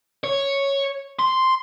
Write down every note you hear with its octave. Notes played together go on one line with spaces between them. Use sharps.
C#5
C6